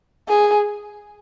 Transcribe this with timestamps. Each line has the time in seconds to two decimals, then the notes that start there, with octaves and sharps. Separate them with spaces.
0.29 G#4